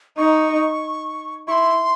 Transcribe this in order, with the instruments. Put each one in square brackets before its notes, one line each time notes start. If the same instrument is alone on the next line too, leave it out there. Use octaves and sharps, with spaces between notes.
[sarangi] D#4 [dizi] C#6
[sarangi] E4 [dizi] C6 C#6